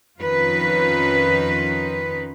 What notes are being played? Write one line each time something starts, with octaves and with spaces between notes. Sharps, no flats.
F2 D#3 C#4 D#4 F4 B4